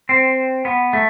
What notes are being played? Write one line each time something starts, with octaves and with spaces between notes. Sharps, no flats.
C4
B3
A3